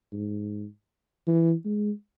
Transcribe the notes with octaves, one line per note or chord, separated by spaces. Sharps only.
G#2
E3
G#3